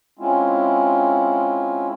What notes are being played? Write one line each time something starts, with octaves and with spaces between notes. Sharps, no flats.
G#3 C4 C#4 E4 F4